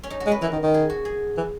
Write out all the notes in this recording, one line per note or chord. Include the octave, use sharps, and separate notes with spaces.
C#4
D#4
F#4
G#3
B4
E3 A#4
D#3
D#3
G#4
F#4
G#4
E3